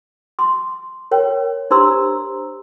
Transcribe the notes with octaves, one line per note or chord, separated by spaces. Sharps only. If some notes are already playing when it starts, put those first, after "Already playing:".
C6 D6
A#4 C#5 G5
D4 G4 C5 A#5 C6 E6